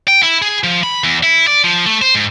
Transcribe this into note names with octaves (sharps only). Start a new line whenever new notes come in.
G5
E4
G#4
F3
B5
E2
E4
D5
F3
A3
C5
G#2